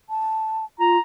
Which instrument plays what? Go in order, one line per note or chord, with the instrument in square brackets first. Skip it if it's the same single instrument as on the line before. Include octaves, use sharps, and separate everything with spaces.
[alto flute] A5
[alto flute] F4 [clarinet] A#5